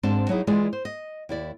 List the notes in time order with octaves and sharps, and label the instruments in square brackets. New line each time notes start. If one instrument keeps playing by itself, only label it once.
[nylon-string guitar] G#2 C4 D4 A5
F#3 D#4 E4 G#4
E3 G#3 E4 F4 G#4 D5
C5
D#5
D#2 E4 D5